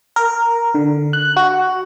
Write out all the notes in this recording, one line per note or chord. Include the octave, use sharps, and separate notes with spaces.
A#4
D3
F#6
F#4